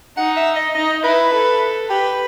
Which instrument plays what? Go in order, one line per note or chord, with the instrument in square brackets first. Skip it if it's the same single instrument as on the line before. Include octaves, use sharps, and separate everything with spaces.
[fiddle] D#4 [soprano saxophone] F#5
[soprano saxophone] E5
D#5
[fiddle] D#4 [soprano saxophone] D#5
[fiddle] E4 [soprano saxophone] B4
[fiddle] A4
[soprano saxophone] G4 [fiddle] B4